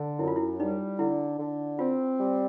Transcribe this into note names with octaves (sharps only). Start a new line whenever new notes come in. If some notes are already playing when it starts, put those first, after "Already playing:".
Already playing: D3
F#2 E4
F4
E4
G3 D#4
D3 E4
D3
C4 F4
G3